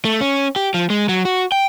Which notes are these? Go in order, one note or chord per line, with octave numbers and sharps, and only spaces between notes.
A3
C#4
G4
F3
G#3
F#3
F#4
G5